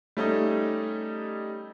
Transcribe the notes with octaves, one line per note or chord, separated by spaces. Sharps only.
G3 A3 C#4 D#4 G4